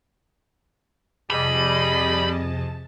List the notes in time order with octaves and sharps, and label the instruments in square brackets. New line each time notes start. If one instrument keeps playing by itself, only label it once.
[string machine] F2 C3 A5 [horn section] G3 [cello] G#4 D#5 [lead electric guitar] B5